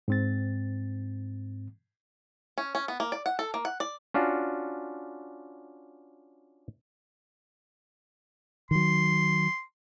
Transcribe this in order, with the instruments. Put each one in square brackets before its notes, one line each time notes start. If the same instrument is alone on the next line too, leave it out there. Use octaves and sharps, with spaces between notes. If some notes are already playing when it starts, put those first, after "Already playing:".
[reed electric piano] G#2 C4 A6
[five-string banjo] C#4
C#4
B3
A#3
D5
F#5
A4
A#3
F#5
D5
[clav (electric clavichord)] C#4 D4 F4 F#4
[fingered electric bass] D#3 F#3 [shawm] C6